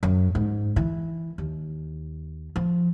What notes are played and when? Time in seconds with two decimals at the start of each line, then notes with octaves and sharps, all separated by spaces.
0.03 F#2
0.35 G#2
0.76 E3
1.38 D#2
2.56 F3